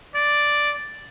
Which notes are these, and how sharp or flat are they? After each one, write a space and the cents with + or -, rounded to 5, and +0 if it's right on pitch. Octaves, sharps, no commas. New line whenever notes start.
D5 +0